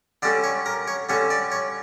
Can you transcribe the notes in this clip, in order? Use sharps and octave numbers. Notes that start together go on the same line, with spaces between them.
D3 G3 C#4 D5
C#5
A#4
C#5
D3 G3 C#4 C#5
D5
C#5